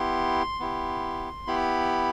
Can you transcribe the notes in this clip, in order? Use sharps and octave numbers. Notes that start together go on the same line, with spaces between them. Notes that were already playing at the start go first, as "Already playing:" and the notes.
Already playing: B3 E4 G4 C6
B3 E4 G4
B3 E4 G4 B5